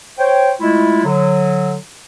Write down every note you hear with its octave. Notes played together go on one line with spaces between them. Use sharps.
C5 C#5 G5
G#3 A3 E4 F4
D3 F#3